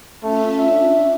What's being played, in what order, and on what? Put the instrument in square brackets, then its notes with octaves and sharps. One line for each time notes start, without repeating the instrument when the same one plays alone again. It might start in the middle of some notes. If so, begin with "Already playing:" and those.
[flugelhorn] A3 [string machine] C#4 F4 E5
[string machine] D4 [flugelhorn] E5